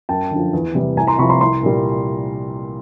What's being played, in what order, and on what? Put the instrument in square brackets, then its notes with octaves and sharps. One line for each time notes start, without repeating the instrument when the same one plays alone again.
[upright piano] F#2 G5 A5
D3
F3
E2
C3 E3 G3
C2 G#5 A#5
A#5 C6
C3 F3 B5 C#6
A#5 C6
C2 A#5 C6
A#2 G3